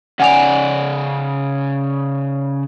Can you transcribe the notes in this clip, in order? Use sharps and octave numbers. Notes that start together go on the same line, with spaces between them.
C#3 D5 F#5 G#5 F7